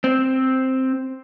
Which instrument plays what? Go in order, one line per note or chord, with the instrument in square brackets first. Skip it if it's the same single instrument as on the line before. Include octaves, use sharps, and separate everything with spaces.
[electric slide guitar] C4